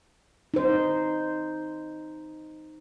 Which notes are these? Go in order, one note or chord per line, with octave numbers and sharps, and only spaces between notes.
D#4 C5